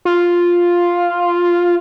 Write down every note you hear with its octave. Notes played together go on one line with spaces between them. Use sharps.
F4